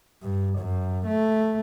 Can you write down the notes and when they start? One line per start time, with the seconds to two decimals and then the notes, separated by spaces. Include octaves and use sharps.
0.22 G2
0.58 F#2
1.06 A3